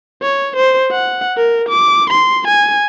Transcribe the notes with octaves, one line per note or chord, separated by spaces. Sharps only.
C#5
C5
F#5
A#4
D6
C6
G#5